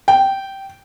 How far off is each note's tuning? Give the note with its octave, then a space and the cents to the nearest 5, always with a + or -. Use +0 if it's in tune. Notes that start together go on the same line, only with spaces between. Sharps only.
G5 -10